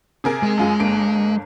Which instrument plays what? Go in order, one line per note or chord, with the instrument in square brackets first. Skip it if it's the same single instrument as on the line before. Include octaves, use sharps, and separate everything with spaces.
[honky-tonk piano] C3 G#4 A#4
[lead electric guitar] G#3
[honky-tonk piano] F#2 F4 G#4
G1 A#3 D7